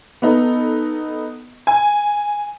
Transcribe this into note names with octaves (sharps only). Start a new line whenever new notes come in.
B3 D#4 A4
G#5